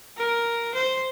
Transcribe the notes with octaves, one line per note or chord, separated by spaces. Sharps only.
A#4
C5